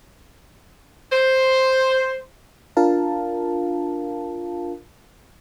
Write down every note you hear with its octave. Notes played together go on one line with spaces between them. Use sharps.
C5
D4 F4 A#4 F5 A5